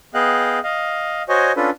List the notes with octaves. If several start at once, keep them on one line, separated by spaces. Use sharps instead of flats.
B3 G#4 D#5 F5 G5 F#6
D#5 F5
F#4 C5 C#5 D#5 G#5
C#4 D4 F4 A4 B4